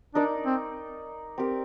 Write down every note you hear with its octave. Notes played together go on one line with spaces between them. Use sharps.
D4 D#4 A#4 D5
C4
C4 G4 A#4